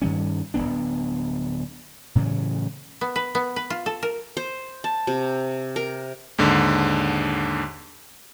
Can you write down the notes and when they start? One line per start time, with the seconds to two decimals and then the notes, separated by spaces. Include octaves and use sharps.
0.02 G2 D#3 G3 C#4
0.54 D1 F2 B3 D4
2.15 A2 C#3 E3 F#3
3.01 B3
3.16 B4
3.35 B3
3.56 B4
3.70 F4
3.86 A4
4.03 A#4
4.37 C5
4.84 A5
5.07 C3
5.76 A#4
6.38 D#2 G#2 D3